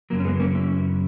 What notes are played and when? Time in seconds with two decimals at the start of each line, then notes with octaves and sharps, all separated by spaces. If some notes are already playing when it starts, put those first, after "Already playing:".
0.10 F#2 C#3 F#3 A#3
0.20 C#4
0.25 G#3 B3
0.40 A#3 C#4
0.55 C#4 E4